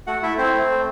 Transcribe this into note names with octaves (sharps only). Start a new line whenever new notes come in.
A3 F#4 F#5
A3 E4 E5
C4 E4 C5
A3
A3